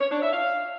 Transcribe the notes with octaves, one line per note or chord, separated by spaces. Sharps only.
C#5
D4
E5
F5